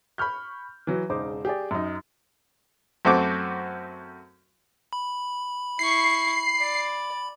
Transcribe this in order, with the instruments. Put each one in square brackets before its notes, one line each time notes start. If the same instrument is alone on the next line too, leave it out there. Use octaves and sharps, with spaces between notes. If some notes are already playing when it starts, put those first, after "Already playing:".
[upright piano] B5 C#6 F6 G6
E3 F#3
E1 C#3 D#4 C5 D6
G4 G#4 D5
F#2 D#4
[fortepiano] F#2 A3 C4 F#4 D6
[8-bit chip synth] B5
[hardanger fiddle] E4 C#6 [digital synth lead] C7
[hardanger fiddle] D5